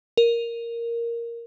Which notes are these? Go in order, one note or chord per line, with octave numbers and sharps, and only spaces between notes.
A#4